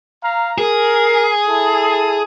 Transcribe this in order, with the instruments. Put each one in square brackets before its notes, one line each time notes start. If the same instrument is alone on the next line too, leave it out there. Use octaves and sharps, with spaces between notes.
[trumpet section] F5 A#5
[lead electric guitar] G#4 [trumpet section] A#4
[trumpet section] E4 A4 A5